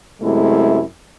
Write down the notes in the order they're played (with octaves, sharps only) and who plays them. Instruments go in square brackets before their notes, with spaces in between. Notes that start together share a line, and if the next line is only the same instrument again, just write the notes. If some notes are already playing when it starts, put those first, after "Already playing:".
[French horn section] F#2 C3 G#3 A3 E4